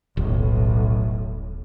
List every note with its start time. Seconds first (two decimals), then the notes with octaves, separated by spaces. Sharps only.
0.17 D#1 B1 A2